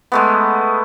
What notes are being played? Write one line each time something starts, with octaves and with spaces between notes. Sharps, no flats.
G#3 A3 B3